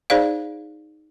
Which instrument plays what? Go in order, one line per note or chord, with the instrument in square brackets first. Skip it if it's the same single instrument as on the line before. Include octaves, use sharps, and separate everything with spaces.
[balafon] D#4 G#4 C5 D5 F5